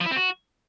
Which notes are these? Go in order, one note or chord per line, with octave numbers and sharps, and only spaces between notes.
F3
E4
C4
F#4